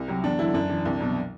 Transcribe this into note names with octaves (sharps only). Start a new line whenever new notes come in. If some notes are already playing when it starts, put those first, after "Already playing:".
Already playing: C2
C3 F#3
E2 D4
D3 F#3 E4
F#2 D4
E3
C2
B2 F#3